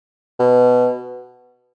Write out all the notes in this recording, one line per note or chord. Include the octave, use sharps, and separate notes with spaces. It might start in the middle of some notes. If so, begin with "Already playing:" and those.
B2